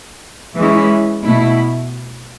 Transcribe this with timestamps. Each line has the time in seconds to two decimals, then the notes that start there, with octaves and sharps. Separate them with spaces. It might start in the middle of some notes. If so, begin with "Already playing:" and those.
0.57 E3 G#3 C#4 E4
1.23 B2 A3 E4